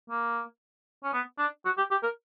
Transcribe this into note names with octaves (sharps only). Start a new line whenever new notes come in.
A#3
C#4
B3
D4
F#4
G4
G4
A#4